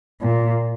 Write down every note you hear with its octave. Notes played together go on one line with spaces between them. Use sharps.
A#2